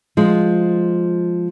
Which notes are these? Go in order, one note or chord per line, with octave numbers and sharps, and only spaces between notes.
F3 G#3